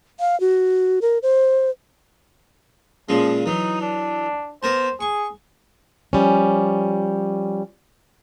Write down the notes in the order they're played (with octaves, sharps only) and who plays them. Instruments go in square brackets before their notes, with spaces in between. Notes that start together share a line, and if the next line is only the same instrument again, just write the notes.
[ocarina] F5
F#4
A#4
C5
[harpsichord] A#2 C#3 G#3 [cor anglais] F3
[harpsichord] E3 F#3 [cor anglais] D#4
[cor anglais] D4
[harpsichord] B3 A#4 A5 [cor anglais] C5
[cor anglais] G#4 [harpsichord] C#6
[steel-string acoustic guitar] F3 G3 C#4